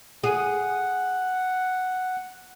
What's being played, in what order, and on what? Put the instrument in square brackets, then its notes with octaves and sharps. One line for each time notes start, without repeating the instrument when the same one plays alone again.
[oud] G#4 [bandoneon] F#5